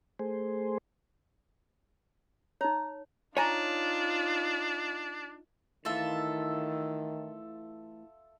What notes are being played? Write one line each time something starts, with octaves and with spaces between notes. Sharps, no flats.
A3 G#4 C5
D#4 C#5 A#5
D4 D#4 F4 C#5 G#5 A#5
A2 D#3 E3 F4 A4 E5